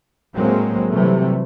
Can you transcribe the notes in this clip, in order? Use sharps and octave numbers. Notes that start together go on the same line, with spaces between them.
A2 F#3 G#3 A#3 C4
C3 E3 F#3 G3 A3